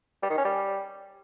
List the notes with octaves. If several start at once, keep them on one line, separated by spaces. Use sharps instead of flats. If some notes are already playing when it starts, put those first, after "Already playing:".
G3
D#3
C#4
G3